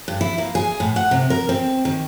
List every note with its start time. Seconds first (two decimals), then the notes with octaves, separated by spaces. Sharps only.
0.08 G2
0.21 E4
0.38 A#3
0.55 G#4
0.80 A2
0.96 F#5
1.11 C3
1.30 A#4
1.49 C4
1.85 D#3